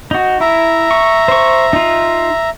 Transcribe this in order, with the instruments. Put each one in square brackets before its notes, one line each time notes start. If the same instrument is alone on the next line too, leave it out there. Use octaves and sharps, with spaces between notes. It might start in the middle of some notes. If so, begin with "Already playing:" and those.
[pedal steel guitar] D#4 F#4
[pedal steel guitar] E4 [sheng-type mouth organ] E5 A#5
[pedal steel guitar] C#6
C5 C#6
D#4 F4